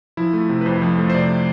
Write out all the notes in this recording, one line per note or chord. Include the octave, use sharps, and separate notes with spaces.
F3 E4
A3
C3
B4
F2 C5
F3
A3
C5
C3 D5